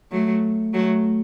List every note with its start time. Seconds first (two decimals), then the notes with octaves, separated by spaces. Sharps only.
0.12 F#3 A3
0.73 F#3 A3